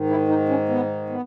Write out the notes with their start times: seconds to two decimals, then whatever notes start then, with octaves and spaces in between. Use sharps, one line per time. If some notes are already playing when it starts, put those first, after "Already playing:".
Already playing: G#2 D#3
0.10 E4
0.28 D#4
0.49 C#4
0.69 B3
1.09 B3